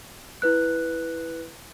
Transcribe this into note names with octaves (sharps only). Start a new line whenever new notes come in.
E4 B4 F#6